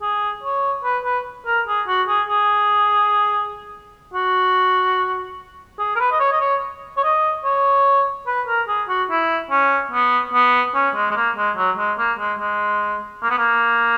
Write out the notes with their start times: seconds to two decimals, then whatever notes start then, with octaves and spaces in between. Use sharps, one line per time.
0.01 G#4
0.43 C#5
0.84 B4
1.05 B4
1.46 A#4
1.67 G#4
1.88 F#4
2.07 G#4
2.28 G#4
4.14 F#4
5.79 G#4
5.96 A#4
5.99 B4
6.12 D#5
6.20 C#5
6.32 D#5
6.41 C#5
6.97 C#5
7.03 D#5
7.44 C#5
8.27 B4
8.47 A#4
8.68 G#4
8.88 F#4
9.10 E4
9.50 C#4
9.91 B3
10.33 B3
10.74 C#4
10.95 G#3
11.11 G#3
11.16 A#3
11.36 G#3
11.56 F#3
11.77 G#3
11.98 A#3
12.19 G#3
12.39 G#3
13.22 A#3
13.30 B3
13.38 A#3